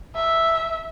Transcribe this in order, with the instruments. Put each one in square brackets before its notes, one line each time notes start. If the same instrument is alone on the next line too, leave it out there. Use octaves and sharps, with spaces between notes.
[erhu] E5